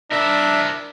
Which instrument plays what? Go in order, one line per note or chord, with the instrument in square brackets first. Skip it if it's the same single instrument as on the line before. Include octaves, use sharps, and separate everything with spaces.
[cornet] D4 [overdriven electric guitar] E4 A#4 [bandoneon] E5